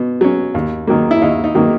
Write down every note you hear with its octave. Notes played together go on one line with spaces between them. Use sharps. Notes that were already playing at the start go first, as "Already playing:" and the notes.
Already playing: B2
F#3 C#4
D#2
D#3 F#3 A#3
E4
D#2 D#4
D#4
D#3 F#3 A#3